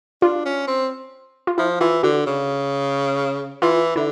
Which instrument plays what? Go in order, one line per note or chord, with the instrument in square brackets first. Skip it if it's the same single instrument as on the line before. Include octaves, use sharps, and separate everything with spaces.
[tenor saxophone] D4 [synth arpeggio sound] F4
[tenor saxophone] C#4
C4
[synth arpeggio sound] F4
[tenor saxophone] F3 [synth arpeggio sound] E4
[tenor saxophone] E3 [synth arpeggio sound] F4
[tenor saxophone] D3 [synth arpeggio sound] F#4
[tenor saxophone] C#3
[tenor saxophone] E3 [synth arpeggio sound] F4
[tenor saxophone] D3 [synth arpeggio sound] E4